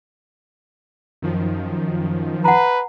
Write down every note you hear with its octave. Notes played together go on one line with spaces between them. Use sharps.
F#2 D#3 F3
B4 F#5 G#5 A#5